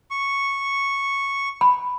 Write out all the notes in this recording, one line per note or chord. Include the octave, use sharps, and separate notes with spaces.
C#6
B5